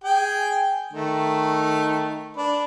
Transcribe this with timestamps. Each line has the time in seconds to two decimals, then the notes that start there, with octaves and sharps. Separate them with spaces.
0.04 G#4 G5 G#5
0.93 D#3 A3
2.37 D4 B4